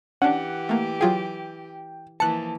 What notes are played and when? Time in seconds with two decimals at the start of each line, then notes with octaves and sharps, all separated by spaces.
0.22 E3 C#4 D4 G4 F#5
0.69 A3 A#3
1.01 F#3 F4 G#4 G5
2.20 E3 F3 A#3 A5 F#6 C#7